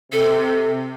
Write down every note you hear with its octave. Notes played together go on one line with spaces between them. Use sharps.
C3 A4